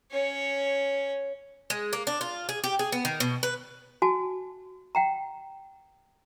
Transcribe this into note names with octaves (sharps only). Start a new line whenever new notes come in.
C#4 C#5
G#3
A#3
D4
F4
G#4
G4
G#4
B3
D#3
B2
B4
F#4 G#5 A5
F#5 G5 A#5